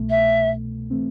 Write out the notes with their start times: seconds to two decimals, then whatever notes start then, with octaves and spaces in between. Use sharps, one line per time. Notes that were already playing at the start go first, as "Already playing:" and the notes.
Already playing: C2 B2 A3
0.10 E5
0.90 E3 A3 C4